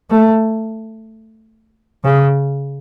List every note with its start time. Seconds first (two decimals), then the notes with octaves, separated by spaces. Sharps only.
0.10 A3
2.04 C#3